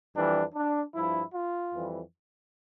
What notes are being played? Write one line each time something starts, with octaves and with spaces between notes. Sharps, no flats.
F2 E3 G3 D4
D4
G2 F3 E4
F4
F2 E3 G3